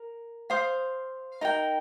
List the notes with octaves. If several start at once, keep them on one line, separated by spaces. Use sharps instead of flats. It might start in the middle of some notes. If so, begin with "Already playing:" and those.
Already playing: A#4
C5 F5 D#6
D#4 A#4 G5